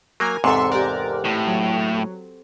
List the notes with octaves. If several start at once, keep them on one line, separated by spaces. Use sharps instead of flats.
F#3 A#3 A#4 G#5
E2 G#2 C3 C4 A4 E5 C6 C#6
G4 A4 A#4 D5 F#6
A2
F#3